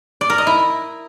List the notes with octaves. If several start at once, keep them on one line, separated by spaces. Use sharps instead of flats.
D5
A#4
D#5
E4